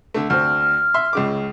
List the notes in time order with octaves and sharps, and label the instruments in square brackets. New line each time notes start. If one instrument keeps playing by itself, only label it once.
[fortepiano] D3 A3
[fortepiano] D2 C4 [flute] F6
[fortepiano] E5 C6
C#2 C#3 D6